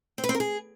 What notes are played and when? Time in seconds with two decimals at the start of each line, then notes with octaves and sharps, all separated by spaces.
0.18 C4
0.24 B4
0.29 C4
0.35 A#4
0.40 G#4